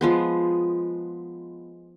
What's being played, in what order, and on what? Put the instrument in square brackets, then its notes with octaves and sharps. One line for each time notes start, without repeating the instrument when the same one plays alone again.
[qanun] F3 G#3 B3